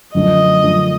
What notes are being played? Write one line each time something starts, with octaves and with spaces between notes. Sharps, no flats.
F#2 D3 F3 A3 D4 D#5
F#2 D3 F3 A3 D4